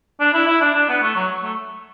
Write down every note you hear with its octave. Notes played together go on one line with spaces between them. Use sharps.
D4
E4
E4
D4
D4
B3
A3
F#3
A3